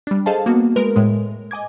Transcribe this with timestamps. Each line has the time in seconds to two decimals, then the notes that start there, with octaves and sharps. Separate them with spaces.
0.07 G3 D4
0.26 G#4 A4 C5 D#5 F5 A5
0.46 A#3 B3 F#4
0.76 G#3 A#4 B4
0.96 A2 G#3
1.51 D#5 G#5 D6 G#6